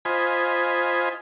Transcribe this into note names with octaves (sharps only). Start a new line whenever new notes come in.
F4 C5 D#5 G#5 B5